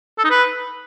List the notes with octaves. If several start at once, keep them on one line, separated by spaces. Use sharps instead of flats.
A4
D#4
B4